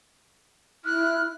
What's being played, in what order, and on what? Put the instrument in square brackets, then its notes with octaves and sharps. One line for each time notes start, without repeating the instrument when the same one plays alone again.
[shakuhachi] E4 [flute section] F6 F#6